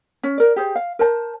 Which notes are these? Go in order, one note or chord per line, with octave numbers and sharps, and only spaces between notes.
C#4
A#4 D5
G4 G#4 C5
F5
A#4 C5 A5